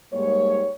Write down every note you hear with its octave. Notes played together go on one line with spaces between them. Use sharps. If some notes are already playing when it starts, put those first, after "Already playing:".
G#2 G3 A#3 C#5